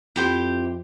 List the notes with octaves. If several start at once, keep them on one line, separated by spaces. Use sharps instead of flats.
F2 E4 G4 C5